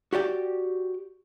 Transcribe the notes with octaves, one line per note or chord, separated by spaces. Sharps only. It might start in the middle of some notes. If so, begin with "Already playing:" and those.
F#4 G4 D5 G5